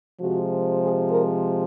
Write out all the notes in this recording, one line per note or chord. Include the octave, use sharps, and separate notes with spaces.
C3 F3 G#3 F#4
G#4
A#4